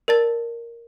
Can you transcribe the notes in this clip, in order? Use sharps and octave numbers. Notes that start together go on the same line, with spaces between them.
A#4 D5 A5 A6